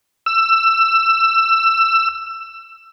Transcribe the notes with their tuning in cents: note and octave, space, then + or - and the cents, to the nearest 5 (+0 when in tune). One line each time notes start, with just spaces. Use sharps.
E6 +20